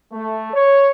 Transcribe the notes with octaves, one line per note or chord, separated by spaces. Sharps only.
A3
C#5